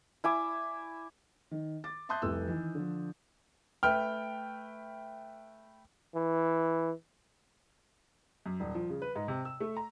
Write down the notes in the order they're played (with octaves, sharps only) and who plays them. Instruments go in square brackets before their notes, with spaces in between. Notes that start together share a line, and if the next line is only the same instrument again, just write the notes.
[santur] E4 G#5 D6
[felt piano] D#3
D6 A6
E5 A5 C6 D#6 F#6 G6
F1 C2 A4 E6
D#3 E3
D3 F3
[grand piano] A3 B4 G5 F6
[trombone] E3
[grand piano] F#2
D#1
F3
C#3
B4
G#2
C3
E6
A3
A#5